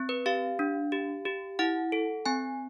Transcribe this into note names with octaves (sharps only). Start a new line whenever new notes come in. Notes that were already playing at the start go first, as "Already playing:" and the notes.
Already playing: C4
B4
G4 F5
D4
G4
G4
E4 F#5
A4
C4 G#5